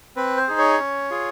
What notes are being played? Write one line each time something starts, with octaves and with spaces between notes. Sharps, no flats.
C4 B4
C5
D#4 G#4
C#5
C#4
F4 G#4